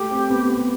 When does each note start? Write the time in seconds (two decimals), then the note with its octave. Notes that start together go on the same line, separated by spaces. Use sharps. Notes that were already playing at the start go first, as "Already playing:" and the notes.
Already playing: A3 G4
0.11 C4
0.30 B3
0.50 B3